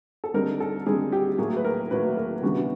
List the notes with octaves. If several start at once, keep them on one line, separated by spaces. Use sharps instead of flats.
A4
D3 G3 C4 D#4 A#4
A4
D3 G3 C4 D#4 G#4
G4
A2 F#3 A#3 G#4
B4
A#4
A2 F#3 A#3 B4
A#4
C#3 E3 G3 B3 D4 F#4